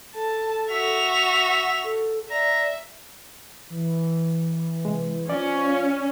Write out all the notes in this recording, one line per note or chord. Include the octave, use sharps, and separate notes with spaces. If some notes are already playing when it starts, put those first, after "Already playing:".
A4 A5
F#4 E5 F7
F#5
A4
D5 E5 A#5
E3
C3 G#3
F3 C#4 D5